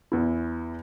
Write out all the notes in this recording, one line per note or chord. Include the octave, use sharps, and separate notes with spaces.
E2 E4